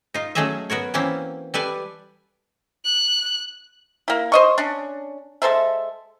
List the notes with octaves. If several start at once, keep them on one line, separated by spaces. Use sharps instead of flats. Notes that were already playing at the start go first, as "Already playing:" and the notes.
D#4 F4
F#3 A3 C#4 G#4 D#5 E5
B3 F#4 A#4 C#5
E3 A#3 C4 C#4 E4
G3 A4 B4 D5 G#5
F#6
A#3 E4
C5 D#5 C#6
C#4 D4
G#3 A4 C5 E5